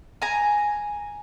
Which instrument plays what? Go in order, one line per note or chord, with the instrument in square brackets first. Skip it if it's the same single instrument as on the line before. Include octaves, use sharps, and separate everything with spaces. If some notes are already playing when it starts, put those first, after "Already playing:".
[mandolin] G#5 A#5